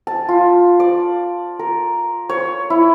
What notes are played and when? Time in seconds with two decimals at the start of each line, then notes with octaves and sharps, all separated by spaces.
0.07 A5
0.29 F4
0.80 D5
1.59 A#4
2.30 C#5
2.70 E4